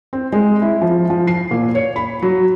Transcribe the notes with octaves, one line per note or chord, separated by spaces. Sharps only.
C4
G#3
E4
F3
F3
C7
A#2
C#5
B5
F#3